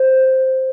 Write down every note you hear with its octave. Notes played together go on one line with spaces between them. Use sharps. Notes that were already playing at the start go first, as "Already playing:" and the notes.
Already playing: C5